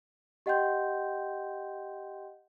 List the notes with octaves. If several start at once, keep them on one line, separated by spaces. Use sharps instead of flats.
G4 D#5 F#5 G5 C6 G6